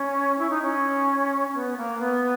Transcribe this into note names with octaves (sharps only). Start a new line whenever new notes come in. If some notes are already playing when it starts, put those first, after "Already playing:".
Already playing: C#4
E4
D#4
C#4
B3
A#3
B3